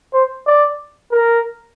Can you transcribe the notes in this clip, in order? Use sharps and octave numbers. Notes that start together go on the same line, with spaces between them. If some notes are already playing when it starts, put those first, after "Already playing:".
C5
D5
A#4